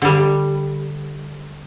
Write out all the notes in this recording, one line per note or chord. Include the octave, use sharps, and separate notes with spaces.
D3 G3